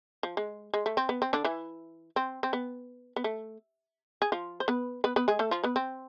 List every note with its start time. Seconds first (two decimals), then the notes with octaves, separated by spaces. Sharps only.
0.23 F3
0.37 G#3
0.74 G#3
0.86 A3
0.97 C4
1.09 B3
1.22 C4
1.33 D3 D4
1.44 E3 E4
2.16 C4
2.43 C4
2.53 B3
3.16 B3
3.24 A3
4.22 G#4
4.32 F3 F4
4.60 C5
4.68 B3 B4
5.04 B3 B4
5.16 B3 B4
5.28 G#3 G#4
5.39 A3 A4
5.51 F3 F4
5.64 B3 B4
5.76 C4